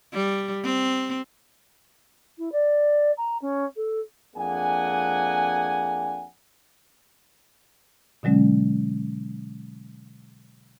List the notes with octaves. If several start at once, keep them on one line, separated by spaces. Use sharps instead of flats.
G3
C4
E4
D5
A#5
C#4
A4
F2 A#3 D4 G#4 F#5 G#5
B2 D3 F#3 G#3 C#4